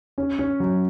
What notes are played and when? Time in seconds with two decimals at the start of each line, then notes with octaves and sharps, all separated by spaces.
0.18 C#4
0.39 C#4
0.60 F#3